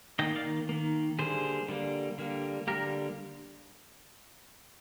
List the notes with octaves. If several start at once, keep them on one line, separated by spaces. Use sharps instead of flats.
D#3 A#3 D#5 G5
D5 F5
D#3 A#3
D3 G3 A#3 G#4 C5
D3 G3 A#3
D3 G3 A#3
D3 G3 A#3 G4 A#4